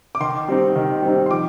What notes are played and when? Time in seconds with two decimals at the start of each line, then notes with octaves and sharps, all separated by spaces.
0.15 D6
0.20 D#3 C6
0.48 G3 C4 D#4
0.76 D#3
1.03 G3 C4 D#4
1.26 C6
1.31 F3 D6